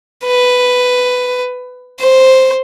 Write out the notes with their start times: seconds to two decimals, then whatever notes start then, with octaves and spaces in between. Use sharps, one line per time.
0.25 B4
2.00 C5